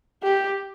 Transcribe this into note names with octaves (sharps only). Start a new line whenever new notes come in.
G4